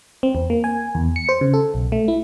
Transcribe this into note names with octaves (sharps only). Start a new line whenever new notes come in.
C4
E2
A#3
G#5
E2
C#7
C5
C#3
A4
B1
A3
E4